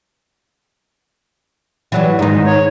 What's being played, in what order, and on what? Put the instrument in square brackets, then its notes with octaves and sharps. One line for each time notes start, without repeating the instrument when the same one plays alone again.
[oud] E3 F#3 G3
[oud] G#2 D#3 [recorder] D#4
[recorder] C#5